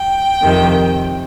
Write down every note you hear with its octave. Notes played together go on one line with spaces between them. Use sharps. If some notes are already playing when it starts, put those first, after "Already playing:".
Already playing: G5
F2 C3 D#3